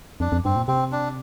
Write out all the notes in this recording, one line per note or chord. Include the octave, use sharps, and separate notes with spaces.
F2 D4
F2
G2 C4
A#2
C3 C4
D4